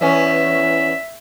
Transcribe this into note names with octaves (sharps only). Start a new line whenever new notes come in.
E2 B3 C#4 E5